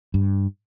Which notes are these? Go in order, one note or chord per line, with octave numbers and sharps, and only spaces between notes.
G2